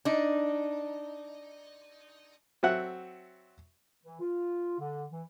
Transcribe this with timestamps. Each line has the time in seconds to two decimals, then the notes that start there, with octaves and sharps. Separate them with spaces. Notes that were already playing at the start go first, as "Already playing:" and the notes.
0.05 D4 D#4
2.63 F#3 C4 A4 E5 F#5 F#6
4.04 E3
4.20 F4
4.80 D3
5.12 E3